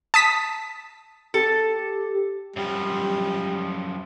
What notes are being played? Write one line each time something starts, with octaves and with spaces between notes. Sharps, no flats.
A5 D#6 B6
G4 A4
F#2 F3 G3